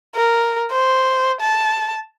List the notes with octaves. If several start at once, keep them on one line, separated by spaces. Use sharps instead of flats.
A#4
C5
A5